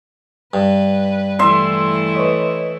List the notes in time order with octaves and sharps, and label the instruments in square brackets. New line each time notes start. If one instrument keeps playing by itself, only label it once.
[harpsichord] G2 [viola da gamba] B4
[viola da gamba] E3 A3 E4 [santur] E5 C6
[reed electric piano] B4 C#5 D#5